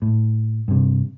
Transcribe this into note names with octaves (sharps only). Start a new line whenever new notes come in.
A2
G2 C3